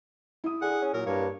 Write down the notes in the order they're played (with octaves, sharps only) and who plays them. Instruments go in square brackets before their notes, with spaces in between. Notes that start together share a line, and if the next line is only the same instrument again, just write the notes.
[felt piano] E4 D#6
[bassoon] D3 [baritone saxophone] G#4 [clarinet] F#5
[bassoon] C#4
[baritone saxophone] A#2 [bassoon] F#3 [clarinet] A#4
[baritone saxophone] G2 [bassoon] A#3 [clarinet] C#5